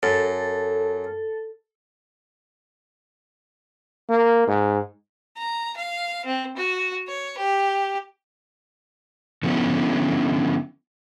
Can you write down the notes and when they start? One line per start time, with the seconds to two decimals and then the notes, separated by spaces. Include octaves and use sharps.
0.03 F#2 A4
4.09 A#3
4.48 G#2
5.38 A#5
5.77 F5
6.25 C4
6.57 F#4
7.08 C#5
7.38 G4
9.43 D3 F3 F#3 B3 C#4 E4